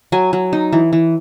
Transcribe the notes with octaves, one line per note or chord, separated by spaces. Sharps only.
F#3 G#5
F#3
D#4
E3
E3